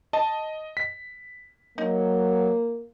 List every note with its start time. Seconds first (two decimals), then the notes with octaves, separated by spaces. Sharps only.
0.13 D#5 A5
0.77 B6
1.78 F#3 A#3 D#4